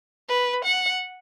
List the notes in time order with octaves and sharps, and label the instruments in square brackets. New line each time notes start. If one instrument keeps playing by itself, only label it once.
[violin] B4
F#5